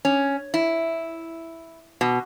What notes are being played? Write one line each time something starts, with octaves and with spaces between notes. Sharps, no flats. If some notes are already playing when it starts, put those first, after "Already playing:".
C#4
E4
B2